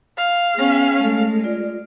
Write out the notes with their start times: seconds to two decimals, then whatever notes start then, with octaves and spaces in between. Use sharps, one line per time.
0.17 F5
0.54 B3 C#4 G#4 G5
1.01 G#3 A3 A4
1.44 F4 D5